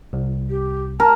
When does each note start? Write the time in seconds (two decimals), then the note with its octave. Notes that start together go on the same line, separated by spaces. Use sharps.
0.13 C2
0.49 G4
1.00 A#4 A5